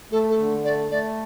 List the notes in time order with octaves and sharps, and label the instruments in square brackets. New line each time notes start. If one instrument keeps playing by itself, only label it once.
[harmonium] A3 [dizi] A4
[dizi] A4
[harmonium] D3
[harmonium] A3 [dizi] D5
[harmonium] A3 [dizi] D5